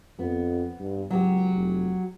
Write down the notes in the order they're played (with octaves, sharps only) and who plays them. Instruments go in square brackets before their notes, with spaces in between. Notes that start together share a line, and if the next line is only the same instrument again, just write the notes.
[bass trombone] F2 [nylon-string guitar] B3
[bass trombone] G2
[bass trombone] C#2 [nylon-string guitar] F#3 G4
[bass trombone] F1